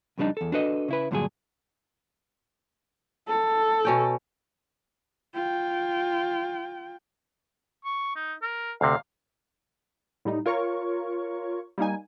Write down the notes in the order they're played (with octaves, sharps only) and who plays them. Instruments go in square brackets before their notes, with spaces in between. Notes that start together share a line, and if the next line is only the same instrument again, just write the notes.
[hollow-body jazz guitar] F2 C#3 G3 G#3 D4 D#4
E2 A4
D4 F#4 A4 B4 D5 D#5
C#3 E4 B4
G2 A#2 D3 F#3 D4 G#4
[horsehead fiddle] A4
[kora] B2 C#4 G5
[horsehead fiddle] F4 G5
[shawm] C#6
D#4
A#4
[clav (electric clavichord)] D2 C3 [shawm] F5
[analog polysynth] A2 G3 D#4
F4 A#4 C#5 C#6
G3 A#3 D#4 G#5